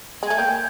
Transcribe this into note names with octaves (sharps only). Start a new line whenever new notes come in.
G#3
A3 G#5
A#3 G5